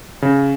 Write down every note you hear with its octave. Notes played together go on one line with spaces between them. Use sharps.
C#3